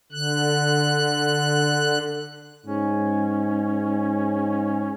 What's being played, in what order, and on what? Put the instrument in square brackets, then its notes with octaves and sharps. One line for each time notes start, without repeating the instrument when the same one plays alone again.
[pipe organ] D3 F#6
[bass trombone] G#2 [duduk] C#4